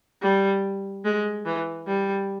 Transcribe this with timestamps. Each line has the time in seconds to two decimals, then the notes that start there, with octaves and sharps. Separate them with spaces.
0.22 G3
1.04 G#3
1.45 E3
1.86 G3